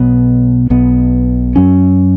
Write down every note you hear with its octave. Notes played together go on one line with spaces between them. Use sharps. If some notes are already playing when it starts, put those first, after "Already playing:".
Already playing: B1 B2 B3
B1 B2 B3
F#2 F#3 C#4